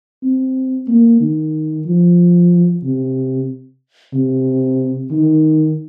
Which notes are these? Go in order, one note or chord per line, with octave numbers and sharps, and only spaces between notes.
C4
A#3
D#3
F3
C3
C3
D#3